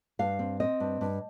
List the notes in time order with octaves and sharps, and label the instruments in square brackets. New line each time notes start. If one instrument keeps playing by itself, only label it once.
[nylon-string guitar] G2 F5
C4
C4 D#5
G2
G2